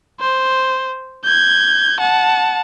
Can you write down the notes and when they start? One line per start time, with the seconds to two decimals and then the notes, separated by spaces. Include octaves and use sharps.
0.20 C5
1.25 G6 G#6
2.00 F#5 A5